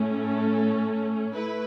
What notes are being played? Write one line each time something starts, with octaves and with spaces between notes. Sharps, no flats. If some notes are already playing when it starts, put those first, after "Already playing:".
Already playing: A2 A3 C#4
A4
A3 E4 B4